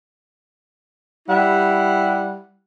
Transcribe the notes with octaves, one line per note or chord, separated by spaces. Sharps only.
G3 E4 F#5